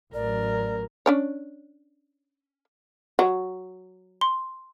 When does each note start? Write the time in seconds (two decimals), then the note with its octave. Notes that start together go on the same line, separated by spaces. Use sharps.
0.14 A1 F#3 A#4 D5
1.06 C#4 D4 C#5
3.19 F#3
4.21 C6